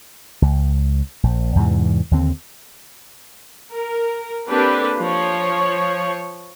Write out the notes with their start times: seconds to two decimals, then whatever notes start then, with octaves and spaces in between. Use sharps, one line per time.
0.42 C#2
1.23 A#1
1.55 E2 G#2 C3 E3
2.11 D#2 D3 C4
3.72 A#4
4.48 A#3 C4 D4 G4 A4 B4
5.00 F3 C#5